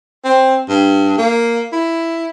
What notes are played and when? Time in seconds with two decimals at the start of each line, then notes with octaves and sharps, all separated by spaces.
0.24 C4
0.69 G2
1.18 A#3
1.72 E4